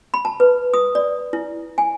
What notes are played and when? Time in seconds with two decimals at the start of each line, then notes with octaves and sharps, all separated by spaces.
0.14 B5
0.25 A5
0.40 B4
0.74 D#6
0.95 D5
1.33 E4
1.78 G#5